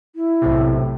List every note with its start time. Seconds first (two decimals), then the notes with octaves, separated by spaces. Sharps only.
0.16 E4
0.42 B1 A2 C3